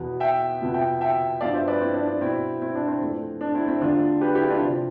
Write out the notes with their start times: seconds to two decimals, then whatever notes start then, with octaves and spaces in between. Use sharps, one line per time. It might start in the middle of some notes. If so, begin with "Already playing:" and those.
Already playing: E2 B2 B3
0.20 E5 G5
0.61 F2 C3 F3 B3
0.74 E5 G5
1.01 E5 G5
1.41 G2 F3 B3 D5 F5
1.54 C5 E5
1.68 B4 D5
1.81 C4 E4
1.94 D4
2.08 D4
2.21 B2 B3 C4 E4
2.61 C4 E4
2.75 D4
2.88 C4
3.02 F2 E3 A3 C4
3.41 D4
3.54 C4 E4
3.68 C4 E4
3.81 E2 D3 A3 C4 D4 F4
4.21 G4 B4
4.34 E4 G4
4.48 D4 F4
4.61 C3 F3 C4